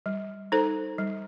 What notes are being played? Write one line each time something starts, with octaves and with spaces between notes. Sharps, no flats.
G3
D#4 A4 C5
G3